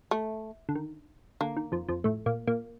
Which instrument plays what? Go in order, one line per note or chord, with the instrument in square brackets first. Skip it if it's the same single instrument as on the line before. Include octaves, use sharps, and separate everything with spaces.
[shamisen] A3
[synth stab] D3
D#3
[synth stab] D3 [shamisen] A#3
[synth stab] D#3
F2 F3
F2 F3
A2 A3
A#2 A#3
A#2 A#3